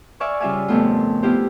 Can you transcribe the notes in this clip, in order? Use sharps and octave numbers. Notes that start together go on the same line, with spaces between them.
D5 E5 F5 G#5 C#6
C#3 G3 F4 E5 F5 G#5
F2 A#2 C#3 A3 B3 F4
B3 E4 F4 G4 C5